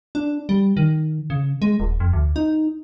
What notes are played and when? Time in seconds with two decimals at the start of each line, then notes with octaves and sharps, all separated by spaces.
0.15 D4
0.49 G3
0.77 D#3
1.30 C#3
1.62 G#3
1.80 D#1
2.00 F2
2.13 D2
2.36 D#4